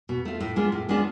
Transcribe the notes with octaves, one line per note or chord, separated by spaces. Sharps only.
B2
A3 F4
A2
G#3 B3 D4 F4
A2
G#3 B3 D4 F4